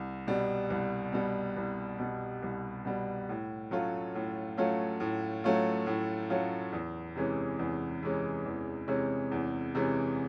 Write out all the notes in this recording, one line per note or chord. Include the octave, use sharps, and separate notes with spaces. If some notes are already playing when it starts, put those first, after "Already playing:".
Already playing: C2
B2 G3
C2
B2 G3
C2
B2 G3
C2
B2 G3
A2
F#3 A3 C#4 F4
A2
F#3 A3 C#4 F4
A2
F#3 A3 C#4 F4
A2
F#3 A3 C#4 F4
E2
C3 E3 G#3 C#4
E2
C3 E3 G#3 C#4
E2
C3 E3 G#3 C#4
E2
C3 E3 G#3 C#4